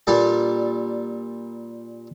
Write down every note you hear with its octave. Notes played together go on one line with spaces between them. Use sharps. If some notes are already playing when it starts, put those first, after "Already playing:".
A#2 G3 D4 A4 A5